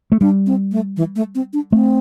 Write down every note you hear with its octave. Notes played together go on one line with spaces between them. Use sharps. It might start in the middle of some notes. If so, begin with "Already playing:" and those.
A3
G3 D4
C4
A3
E3
A3
C4
D4
A3 C4